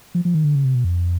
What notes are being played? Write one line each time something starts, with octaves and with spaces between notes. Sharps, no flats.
F3
F3
D#3
D3
C#3
C3
B2
F2